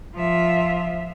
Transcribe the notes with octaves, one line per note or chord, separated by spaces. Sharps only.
F3 F4 E5